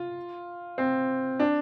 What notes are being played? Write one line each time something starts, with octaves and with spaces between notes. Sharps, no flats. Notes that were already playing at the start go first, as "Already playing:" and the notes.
Already playing: F4
C4
D4